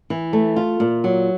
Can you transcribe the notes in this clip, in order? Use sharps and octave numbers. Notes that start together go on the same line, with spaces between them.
E3
A3
F4
A#2
F#3